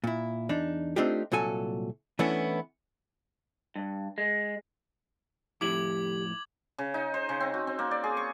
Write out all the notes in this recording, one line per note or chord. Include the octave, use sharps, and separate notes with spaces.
A#2 E4
E2 D4 D#4
A3 C4 D4 D#4 F4 G4
C2 A#2 F#3 A4 G#5
E3 A3 B3 C#4 D4 E4
G2
G#3
F2 A2 E4 G4 D6 G#6 F#7
C#3
D#4
C5
C#3
C4
F#4
C4
A#3
D5
G#4
C#6